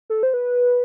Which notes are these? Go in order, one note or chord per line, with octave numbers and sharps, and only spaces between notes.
A4
C5
B4